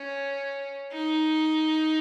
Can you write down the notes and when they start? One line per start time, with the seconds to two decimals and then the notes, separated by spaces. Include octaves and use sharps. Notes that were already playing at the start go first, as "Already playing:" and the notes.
Already playing: C#4
0.92 D#4